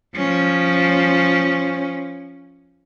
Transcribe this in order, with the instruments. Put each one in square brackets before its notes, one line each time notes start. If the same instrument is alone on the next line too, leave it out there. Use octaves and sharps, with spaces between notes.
[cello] F3 C#4